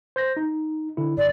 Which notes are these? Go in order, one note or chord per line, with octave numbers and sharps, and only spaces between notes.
C5 G6 A#6
D#4
D3 E4
G1 D5